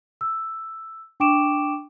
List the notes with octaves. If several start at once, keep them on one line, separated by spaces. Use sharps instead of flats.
E6
D4 G5 C#6 D6 D7 E7